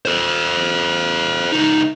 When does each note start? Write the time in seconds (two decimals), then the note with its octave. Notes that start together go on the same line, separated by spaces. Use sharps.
0.05 A4 C5
1.52 C#2 D#4